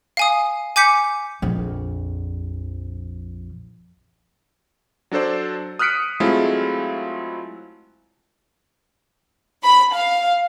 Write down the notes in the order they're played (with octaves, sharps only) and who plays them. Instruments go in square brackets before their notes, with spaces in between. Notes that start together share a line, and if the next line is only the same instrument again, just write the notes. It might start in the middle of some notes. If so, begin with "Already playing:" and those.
[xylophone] F5 G#5 D#6
G#5 D6 G6 B6 C#7
[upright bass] A#1 F2
[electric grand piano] F#3 D4 A4 C5 D5
D#6 F6 F#6 B6 C#7 D7
F#3 G#3 A3 C4 E4 F4
[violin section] B5
F5